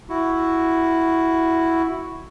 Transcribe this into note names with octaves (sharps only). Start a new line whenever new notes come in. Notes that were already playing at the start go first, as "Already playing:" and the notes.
E4 F#4